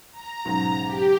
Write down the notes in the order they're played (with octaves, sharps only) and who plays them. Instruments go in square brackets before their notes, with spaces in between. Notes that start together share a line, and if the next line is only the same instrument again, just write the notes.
[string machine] A#5
[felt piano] B1 G#2 C#3
[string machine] G4